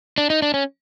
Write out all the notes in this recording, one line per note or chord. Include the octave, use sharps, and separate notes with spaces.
D4
D#4
D4
C#4